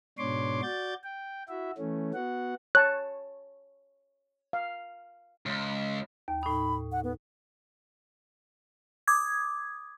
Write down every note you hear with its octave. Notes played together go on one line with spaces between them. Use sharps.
G#2 B2 D4 C#5 C6 D6
F#4 D5 G6 A6
G5
E4 F#4 E5
E3 A3 C#4
B3 F#4 F#5
C#5 A5 F#6
F5
C#2
D#2
A2 D#4 B5
F#5
B3
D6 D#6 G#6